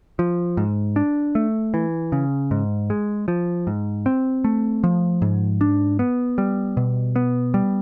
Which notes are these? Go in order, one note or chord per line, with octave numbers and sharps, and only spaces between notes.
F3
G#2
D4
A3
E3
C#3
G#2
G#3
F3
G#2
C4
A3
F3
G#2
D4
B3
G3
B2
B3
G3